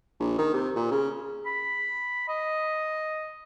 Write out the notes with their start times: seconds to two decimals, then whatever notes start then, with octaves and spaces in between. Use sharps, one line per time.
0.20 A#1
0.38 D#3
0.53 C3
0.76 A#2
0.91 C#3
1.46 B5
2.28 D#5